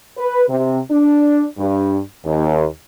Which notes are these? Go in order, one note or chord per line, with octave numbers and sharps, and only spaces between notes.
B4
C3
D4
G2
D#2